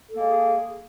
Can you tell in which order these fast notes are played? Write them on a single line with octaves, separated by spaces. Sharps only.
A4 A#3 G#3 G#4